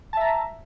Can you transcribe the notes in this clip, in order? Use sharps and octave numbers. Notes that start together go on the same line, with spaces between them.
E5 A5 A#5